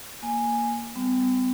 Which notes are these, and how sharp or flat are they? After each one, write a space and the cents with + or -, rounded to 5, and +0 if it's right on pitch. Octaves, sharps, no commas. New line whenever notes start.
A#3 +0 G#5 +0
G3 +0 B3 +45